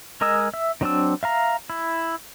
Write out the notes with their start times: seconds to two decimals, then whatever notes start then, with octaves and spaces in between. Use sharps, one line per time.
0.21 G#3 A#4 D#5 G#5 E6
0.54 E5
0.81 D#3 F#3 C4 D4 E6
1.23 E5 F5 A#5
1.70 E4